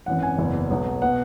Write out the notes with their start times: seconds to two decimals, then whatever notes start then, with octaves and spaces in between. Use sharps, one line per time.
0.06 G#1 F#2 E3 F#5
0.23 G#5
0.38 F#1 E2 E3
0.70 B1 B2 F#3 B3
1.02 B2 B3 F#5